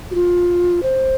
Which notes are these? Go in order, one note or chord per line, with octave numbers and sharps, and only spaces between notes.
F#4
F4
C5